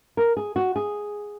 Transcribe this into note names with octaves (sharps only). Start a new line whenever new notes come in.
A#4
G#4
F#4
G#4